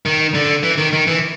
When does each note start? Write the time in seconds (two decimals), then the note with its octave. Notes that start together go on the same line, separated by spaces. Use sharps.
0.05 D#3
0.34 D3
0.63 E3
0.78 D#3
0.93 D#3
1.07 E3